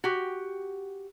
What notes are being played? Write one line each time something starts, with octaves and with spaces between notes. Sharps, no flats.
F#4 G4